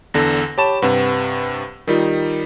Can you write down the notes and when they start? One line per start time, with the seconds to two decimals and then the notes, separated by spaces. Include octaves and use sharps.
0.14 E2 D3 A4 A#6
0.58 G4 C#5 A5 B5 C#6 E7
0.82 G2 C3 B4 F#5
1.87 D#3 G3 D#4 F4 A#4